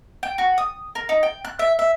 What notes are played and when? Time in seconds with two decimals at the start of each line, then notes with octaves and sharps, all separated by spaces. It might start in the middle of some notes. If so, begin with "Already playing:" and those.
0.23 G5
0.38 F#4
0.58 D#6
0.95 A#4
1.09 D#4
1.23 G5
1.45 F#6
1.59 E5
1.79 E5